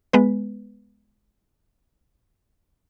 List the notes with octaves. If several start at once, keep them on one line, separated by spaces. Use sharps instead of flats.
G#3 B3 B4